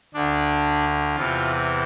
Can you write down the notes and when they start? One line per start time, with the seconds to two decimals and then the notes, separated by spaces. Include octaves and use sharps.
0.14 D2 D3 D4
1.16 E2 C3 E3 F4